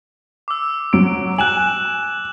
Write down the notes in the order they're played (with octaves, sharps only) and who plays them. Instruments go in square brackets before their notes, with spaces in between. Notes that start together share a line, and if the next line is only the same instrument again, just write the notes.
[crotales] D6 E6
[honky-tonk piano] F#3 D7
[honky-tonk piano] G#5 [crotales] F#6 E7 F#7